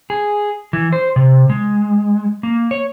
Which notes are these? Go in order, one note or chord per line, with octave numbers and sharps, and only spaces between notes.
G#4
E3
C5
C3
G#3
A#3
C#5